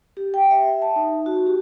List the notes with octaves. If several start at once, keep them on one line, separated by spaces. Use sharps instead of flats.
G4
G5
E5
A5
D#4
F#4
G4